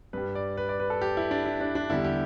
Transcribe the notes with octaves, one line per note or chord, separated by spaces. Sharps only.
G2 G3 B4
D5
B4
D5
B4
A4
G4
E4
D4
E4
D4
D4
E2 D3 G3 E4
G4